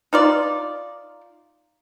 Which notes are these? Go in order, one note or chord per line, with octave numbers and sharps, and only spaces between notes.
D#4 F4 D5